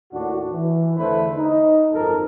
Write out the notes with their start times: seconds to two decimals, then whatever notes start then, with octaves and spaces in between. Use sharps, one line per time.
0.12 D#2 A2 D4 F#4
0.52 E3
0.97 E2 D3 A3 E4 B4 C5
1.37 D#4
1.92 G#1 F#2 F3 A4 A#4